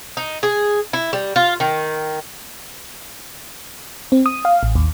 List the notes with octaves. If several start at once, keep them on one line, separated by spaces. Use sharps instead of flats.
D#4
G#4
E4
G3
F4
D#3
C4
D#6
F5
A1
D#2